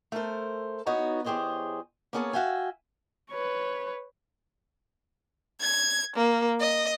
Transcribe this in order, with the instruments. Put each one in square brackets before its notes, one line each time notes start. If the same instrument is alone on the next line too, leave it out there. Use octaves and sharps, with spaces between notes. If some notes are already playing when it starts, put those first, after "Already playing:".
[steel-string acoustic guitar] A3 A4 A#4 C5
B3 D#4 F#4 C#5
E2 G4 G#4 C5 C#5 D#5
A#3 B3 C#4 G#4 C#5 A5
F#4 E5 F5 G5 G#5
[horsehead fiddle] B4 C#5
[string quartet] G#6
A#3
D#5